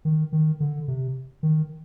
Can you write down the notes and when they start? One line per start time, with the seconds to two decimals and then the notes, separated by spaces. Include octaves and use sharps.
0.05 D#3
0.33 D#3
0.60 D3
0.88 C3
1.43 D#3